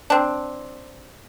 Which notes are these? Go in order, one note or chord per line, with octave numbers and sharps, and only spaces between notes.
C4 D4